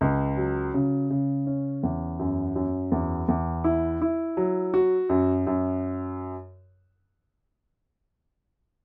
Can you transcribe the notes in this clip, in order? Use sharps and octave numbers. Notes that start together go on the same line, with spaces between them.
C#2
F#3
C#3
C#3
C#4
E2
F#2
F#2
E2
E2
E4
E4
F#3
F#4
F#2
F#2